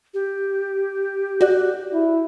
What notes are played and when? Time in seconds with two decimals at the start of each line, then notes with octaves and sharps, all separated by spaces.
0.14 G4
1.41 F#4 D5 F#6
1.93 E4